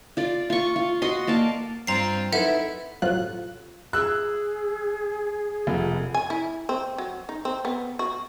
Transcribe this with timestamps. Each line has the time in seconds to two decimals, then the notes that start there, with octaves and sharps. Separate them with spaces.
0.17 F4 D5
0.50 F4 C#6
0.76 F4
1.02 F#4 D#5 C6
1.27 A#3 D5 F5 A5
1.87 G2 C4 F4 A#5 C7
2.32 D#4 E4 A4 B4 E5 F#5
3.02 G1 A2 C3 F#3 F4 F#6
3.93 G#4 E6 F#6
5.67 F1
6.14 G#5
6.30 E4
6.69 C4
6.98 F#3
7.29 D#4
7.45 C4
7.65 B3
7.99 F#4